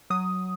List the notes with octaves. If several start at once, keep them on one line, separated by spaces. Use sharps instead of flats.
F#3 D#6